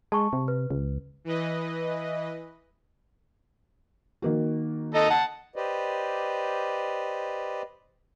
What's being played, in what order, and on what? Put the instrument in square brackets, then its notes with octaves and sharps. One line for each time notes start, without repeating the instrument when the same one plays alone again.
[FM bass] G#3 [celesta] A5 C#6
[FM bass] C3
[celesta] B4
[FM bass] C#2
[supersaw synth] E3 B4 D#5
[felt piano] D#3 A#3 F#4
[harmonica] D#4 A4 D#5
F#5 A5
[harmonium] G4 B4 C5 D5 D#5